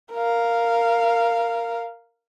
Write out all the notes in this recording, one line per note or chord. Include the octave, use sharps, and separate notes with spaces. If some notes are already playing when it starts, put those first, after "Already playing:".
A#4 F5